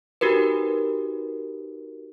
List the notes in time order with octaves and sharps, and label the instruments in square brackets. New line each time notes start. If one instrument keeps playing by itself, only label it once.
[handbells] D#4 F#4 G4 A#4 B4